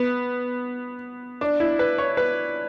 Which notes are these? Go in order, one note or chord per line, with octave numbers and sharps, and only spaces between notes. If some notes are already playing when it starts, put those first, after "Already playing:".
Already playing: B3
D4
E4
B4
C#5
B4